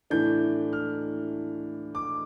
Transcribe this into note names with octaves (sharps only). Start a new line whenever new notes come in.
A2 E3 A3 D4 G6
F6
D6